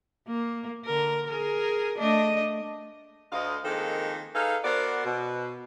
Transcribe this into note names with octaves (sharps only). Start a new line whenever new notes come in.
A#3
D3 A#4
G#4 A#4
A3 D4 D#5
D2 D#5 F5
D#3 F3 G#3 A#3 C4 A4
D#4 G#4 A4 B4 F5
B3 F#4 A#4 C5 D5
B2